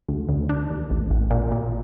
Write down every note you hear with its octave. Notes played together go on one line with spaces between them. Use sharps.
D2
D2
D4
D#2
A1
A1
A#2
A#2